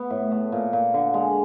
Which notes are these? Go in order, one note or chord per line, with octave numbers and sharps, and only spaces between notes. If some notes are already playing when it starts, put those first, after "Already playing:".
Already playing: B3
A2
A3
A#2
A#2
D3
G#3